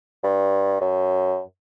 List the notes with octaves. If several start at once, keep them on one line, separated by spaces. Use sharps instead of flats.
G2
F#2